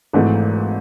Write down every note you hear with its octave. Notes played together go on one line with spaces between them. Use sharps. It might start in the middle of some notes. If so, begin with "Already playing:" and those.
G#1 G#2 E3 A3 D#4